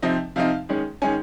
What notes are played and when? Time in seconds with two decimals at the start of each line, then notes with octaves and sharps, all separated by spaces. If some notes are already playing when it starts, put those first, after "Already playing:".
0.02 C3 F3 C4 D#4 D#5
0.36 C3 F3 C4 D#4 F5
0.69 D#3 G#3 C#4
1.02 D#3 G#3 C#4 G#5